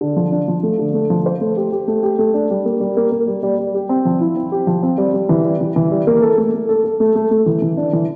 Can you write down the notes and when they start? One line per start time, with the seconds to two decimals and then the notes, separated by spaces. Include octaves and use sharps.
0.01 D3
0.16 F3
0.32 D4
0.48 F3
0.63 A3
0.79 D3
0.94 A3
1.10 F3
1.26 C5
1.41 A3
1.57 G4
1.72 G4
1.88 A3
2.03 G4
2.19 A3
2.34 D4
2.50 G3
2.65 A#3
2.81 G3
2.97 A#3
3.12 A#3
3.27 G3
3.43 G3
3.58 G3
3.74 G4
3.89 C4
4.05 F3
4.20 E4
4.37 C4
4.52 G4
4.67 F3
4.83 C4
4.98 G3
5.14 G3
5.29 E3
5.45 G3
5.61 E3
5.76 E3
5.91 G3
6.07 A#3
6.22 A4
6.38 A3
6.53 A3
6.69 A4
6.85 A4
7.00 A3
7.15 A3
7.31 A3
7.46 E3
7.62 E3
7.77 D4
7.93 E3